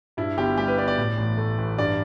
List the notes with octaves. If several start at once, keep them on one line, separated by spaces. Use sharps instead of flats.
G2 E4
G1 G4
G3 G4
B4
B3 D5
D5
A2
A1
A3
A1
G2 D5